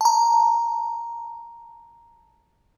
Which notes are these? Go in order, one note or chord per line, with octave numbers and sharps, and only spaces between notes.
A5 A#5